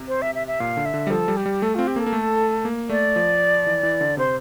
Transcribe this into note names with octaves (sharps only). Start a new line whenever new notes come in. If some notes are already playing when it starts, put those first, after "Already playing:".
Already playing: C3
C5
E5
E5
E5
A#2 F5
D3
E5
D3
G3
F3 A4
G3
G4
G3
A3 A4
C4 F4
G4
A#3
A4
A#3
A3
A#3
A3 D5
F3
E3
E3
D3
C3 C5